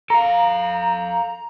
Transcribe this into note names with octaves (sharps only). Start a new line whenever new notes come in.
A4 F5 A#5